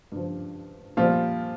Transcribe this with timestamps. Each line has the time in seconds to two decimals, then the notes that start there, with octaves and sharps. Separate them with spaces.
0.12 G2 F3
0.97 A#2 F3 G3 F4